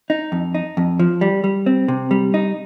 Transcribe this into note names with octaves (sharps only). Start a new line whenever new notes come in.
D#4
F2
D#4
F2
F3
G3
G3
C4
C3
G3
D#4